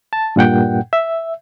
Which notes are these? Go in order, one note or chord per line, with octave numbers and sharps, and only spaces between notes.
A5
G2 A#2 F#5 G5
E5